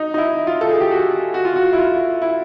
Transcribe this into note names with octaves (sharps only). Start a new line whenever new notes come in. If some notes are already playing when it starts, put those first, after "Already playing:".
Already playing: D#4
D#4
E4
F4
A4
G#4
G4
F#4
F#4
F4
F#4
E4
F4
E4